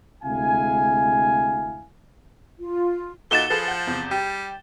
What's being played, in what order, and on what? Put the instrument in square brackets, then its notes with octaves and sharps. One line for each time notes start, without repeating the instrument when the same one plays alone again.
[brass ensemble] D2 C3 G#3 E4 F5 G#5
[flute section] F4
[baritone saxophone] A#2 [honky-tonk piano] D#4 F#4 A4 [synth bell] A6 E7 G7
[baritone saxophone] F3 [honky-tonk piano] G#4 A4 B4
[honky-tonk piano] F#5 G6
E2 C3
[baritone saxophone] G3 [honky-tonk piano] G4